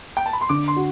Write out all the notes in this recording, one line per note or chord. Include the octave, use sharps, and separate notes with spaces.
G5
A5
B5
C6
D3 D6
C6
F#4